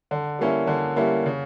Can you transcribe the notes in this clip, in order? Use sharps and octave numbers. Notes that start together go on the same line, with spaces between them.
D3
G3 A#3 C#4 E4
D3
G3 A#3 C#4 E4
C#3